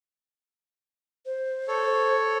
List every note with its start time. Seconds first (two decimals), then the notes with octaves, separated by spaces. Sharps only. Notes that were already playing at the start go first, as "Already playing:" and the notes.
1.25 C5
1.68 A4 C#5